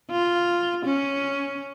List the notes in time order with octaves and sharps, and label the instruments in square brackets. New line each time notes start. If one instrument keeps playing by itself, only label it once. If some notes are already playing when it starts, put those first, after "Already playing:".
[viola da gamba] F4
C#4